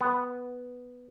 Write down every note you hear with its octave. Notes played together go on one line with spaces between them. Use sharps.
B3